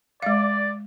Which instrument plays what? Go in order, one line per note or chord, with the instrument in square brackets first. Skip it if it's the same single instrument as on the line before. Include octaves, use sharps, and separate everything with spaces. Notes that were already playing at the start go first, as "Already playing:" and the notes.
[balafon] G#3 F5 [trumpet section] D5